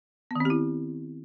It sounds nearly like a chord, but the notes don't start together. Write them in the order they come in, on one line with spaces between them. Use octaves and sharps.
B3 D#3 C4 G4 E4